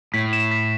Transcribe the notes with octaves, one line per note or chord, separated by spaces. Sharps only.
A2 B6
E7
B6